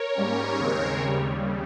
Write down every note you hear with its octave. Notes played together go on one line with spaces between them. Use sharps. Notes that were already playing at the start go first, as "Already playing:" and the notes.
Already playing: A#4 C#5
G#2 G3 A#3 C#4
D#2 C#3 G#3 C4
D#2 C#3 G3